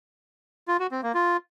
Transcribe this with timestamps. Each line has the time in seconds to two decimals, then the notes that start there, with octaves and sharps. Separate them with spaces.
0.68 F4
0.80 F#4
0.91 C4
1.03 A#3
1.14 F4